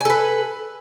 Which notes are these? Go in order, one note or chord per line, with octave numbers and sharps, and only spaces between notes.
A4 B4 G#5